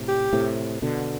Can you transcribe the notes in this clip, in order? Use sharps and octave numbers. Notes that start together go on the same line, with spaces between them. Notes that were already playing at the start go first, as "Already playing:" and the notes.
Already playing: A2 C3
G4
A2 C3
B2 D3